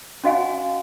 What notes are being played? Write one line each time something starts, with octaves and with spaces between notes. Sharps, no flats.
C#4 F#4 D#5 F5 F#5 G#5